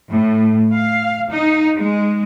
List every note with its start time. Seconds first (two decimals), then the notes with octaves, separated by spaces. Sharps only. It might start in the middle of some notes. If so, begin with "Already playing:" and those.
0.12 A2
0.74 F5
1.30 D#4
1.79 G#3